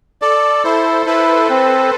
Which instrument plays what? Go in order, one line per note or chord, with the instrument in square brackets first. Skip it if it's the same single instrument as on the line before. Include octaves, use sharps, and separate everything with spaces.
[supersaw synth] A4 [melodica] D5
[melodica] E4 [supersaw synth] C5
[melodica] E4 [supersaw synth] B4
[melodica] C4